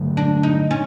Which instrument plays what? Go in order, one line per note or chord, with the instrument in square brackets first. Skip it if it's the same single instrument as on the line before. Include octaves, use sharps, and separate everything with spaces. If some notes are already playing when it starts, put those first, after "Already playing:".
Already playing: [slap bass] G2 D3 F#3 A3
[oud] D4
D#4
C#4